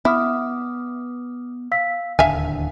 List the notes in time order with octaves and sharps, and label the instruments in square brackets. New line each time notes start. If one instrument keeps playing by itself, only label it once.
[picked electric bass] B3 [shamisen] E4 [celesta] D6 D#6 F6
[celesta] F5 E6 B6
[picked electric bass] D1 D#2 D3 [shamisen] E5 F5 G#5 [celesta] E6